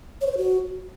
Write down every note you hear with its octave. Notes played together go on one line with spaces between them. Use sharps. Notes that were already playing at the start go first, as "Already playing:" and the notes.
C#5
C5
C#5
F#4